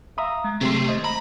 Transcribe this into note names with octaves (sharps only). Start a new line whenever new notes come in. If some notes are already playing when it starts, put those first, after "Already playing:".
E5 F5 A#5 D#6
G#3
C3 F#3 A3 C4 G4 G#4 C6
D#2 C5 D#5
A#5 B5